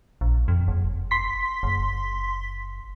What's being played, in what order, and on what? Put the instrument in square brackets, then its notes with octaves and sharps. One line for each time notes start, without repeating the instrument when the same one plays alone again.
[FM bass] A#1
F2
F#1
[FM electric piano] C6 B6
[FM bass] F#1